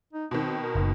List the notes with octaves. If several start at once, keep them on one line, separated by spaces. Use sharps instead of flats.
D#4
B2 D#3 C4
A#4
F#1